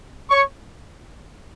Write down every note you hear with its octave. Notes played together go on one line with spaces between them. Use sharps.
C#5 C#6